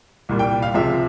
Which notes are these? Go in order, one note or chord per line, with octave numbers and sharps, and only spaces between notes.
C2 A#2 G3
G5
F5
C#2 C3 F3 G#3 E5